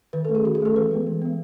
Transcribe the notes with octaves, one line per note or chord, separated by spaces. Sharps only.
D#3 B4
A4
A3 C#4
G#4
D#3 F#4
G#4
A3 C#4 A4
E3 B4
G#3 B3
E3
G#3 B3